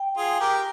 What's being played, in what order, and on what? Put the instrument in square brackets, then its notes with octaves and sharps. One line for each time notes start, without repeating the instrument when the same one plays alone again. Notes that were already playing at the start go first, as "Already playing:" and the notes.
Already playing: [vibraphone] G5
[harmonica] F4 G#4
G4 A#4